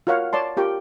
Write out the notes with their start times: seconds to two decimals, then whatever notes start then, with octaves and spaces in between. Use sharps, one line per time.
0.07 F4 F#4 A#4 C#5 F5 F#5
0.33 C#5 D5 A5 C6
0.57 F4 G4 A#4 G5 C#6